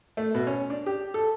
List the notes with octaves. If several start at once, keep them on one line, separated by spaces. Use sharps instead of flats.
A3
B2
C#4
D4
G4
A4